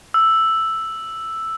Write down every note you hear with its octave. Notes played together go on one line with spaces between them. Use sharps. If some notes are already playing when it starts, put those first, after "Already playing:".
E6